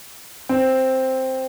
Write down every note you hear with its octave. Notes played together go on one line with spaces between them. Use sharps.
C4